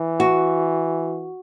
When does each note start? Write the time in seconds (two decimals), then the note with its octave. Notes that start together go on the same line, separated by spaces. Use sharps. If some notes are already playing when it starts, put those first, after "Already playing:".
Already playing: E3
0.20 F#4